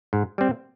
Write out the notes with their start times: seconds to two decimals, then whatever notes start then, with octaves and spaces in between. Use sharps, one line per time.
0.13 G#2
0.38 G3 C4